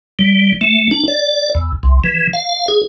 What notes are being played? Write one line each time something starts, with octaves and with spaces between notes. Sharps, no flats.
G3
A3
D4
D5
E2
C2
E3
F5
G#4